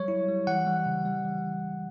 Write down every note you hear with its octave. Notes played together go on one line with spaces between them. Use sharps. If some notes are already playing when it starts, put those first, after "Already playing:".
Already playing: F#3 G3 C#5
E4
G3
E3 F#5
G3
C#3
G3
E3